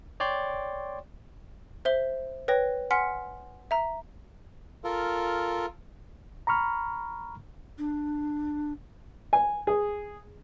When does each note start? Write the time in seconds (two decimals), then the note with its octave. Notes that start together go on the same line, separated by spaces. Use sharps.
0.20 C#5 D5 G5 C6
1.85 C5 E5 G7
2.48 B4 C#5 G5 A#6
2.91 F#5 G#5 C6 F6 B6 C#7
3.71 E5 A#5
4.84 F4 A4 A#4
6.47 A#5 B5 C#6 F6
7.78 D4
9.33 G#5
9.67 G#4